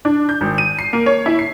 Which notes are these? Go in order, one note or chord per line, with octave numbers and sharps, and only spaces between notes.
D4
G6
G#1
D#7
C7
A#3
C#5
E4
C7